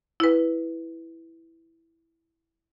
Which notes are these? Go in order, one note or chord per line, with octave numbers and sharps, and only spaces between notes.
E4 B4